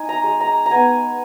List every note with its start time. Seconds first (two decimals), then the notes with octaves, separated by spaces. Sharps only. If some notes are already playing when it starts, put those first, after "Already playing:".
Already playing: D#4 G#5
0.09 A#5
0.24 G#3
0.40 A#5
0.66 A#5
0.71 B3 G#5